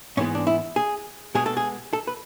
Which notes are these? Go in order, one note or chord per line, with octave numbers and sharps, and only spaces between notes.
G#2 E3 G#3 B3 C#4
D4
E4
G#4
B2 G#3 B3 G#4
A4
G#4
A4
B4